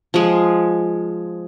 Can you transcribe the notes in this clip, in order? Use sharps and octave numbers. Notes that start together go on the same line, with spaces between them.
F3 G#3